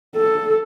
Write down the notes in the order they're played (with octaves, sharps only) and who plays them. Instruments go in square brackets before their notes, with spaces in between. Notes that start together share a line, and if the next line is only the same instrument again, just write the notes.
[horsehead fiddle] A4